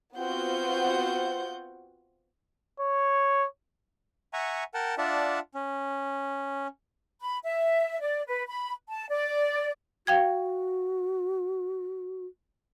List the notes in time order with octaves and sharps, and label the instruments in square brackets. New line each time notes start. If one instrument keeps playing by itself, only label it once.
[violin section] B3 C4 F4 F#4 F#5 G6
[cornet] C#5
[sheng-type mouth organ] E5 F#5 G#5 A#5 C#6
A#4 F#5 G5 A5
D4 F4 D5 E5 F#5 A5
C#4
[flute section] B5
E5
D5
B4
B5
A5
D5
[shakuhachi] F#4 [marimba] F5 G5 G#6